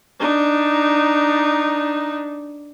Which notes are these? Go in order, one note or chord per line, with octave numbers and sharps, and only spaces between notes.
D4 D#4